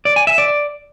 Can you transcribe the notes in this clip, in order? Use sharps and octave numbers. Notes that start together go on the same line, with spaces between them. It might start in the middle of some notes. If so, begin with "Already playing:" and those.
D5
G#5
E5
D5